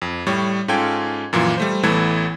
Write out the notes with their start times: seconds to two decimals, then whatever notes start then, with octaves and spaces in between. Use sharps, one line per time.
0.02 F2
0.26 A2 G3 C#5
0.68 G#2 C#4 F4 A4 G5 G#6
1.33 F#2 A#2 E3 F3
1.57 G3 A3 C5
1.83 A1 E3 A3 B3 E4 G#6